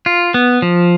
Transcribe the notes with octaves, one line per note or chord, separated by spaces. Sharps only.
F4
B3
F3